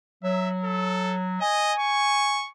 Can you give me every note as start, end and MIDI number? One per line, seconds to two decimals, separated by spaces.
0.24 1.39 54
0.24 0.50 76
0.64 1.16 69
1.41 1.73 75
1.41 2.43 80
1.79 2.50 85